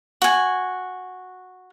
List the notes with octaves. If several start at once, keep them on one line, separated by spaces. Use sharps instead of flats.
F#4 G#5